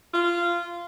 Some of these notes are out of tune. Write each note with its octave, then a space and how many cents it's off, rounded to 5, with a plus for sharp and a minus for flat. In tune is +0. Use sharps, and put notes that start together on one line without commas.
F4 -15